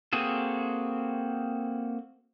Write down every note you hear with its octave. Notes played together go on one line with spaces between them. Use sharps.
A#3 C4 F#4 G#4 A4